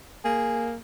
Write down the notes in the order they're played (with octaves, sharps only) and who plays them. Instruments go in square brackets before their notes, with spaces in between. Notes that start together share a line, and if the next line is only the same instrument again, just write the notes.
[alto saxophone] A#3 [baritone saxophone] G#4